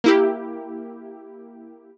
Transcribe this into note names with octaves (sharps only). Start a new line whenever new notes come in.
A#3 E4 G4